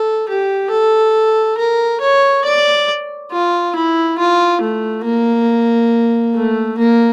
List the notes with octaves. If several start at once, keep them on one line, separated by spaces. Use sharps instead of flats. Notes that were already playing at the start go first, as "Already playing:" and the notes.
Already playing: A4
G4
A4
A#4
C#5
D5
F4
E4
F4
A3
A#3
A3
A#3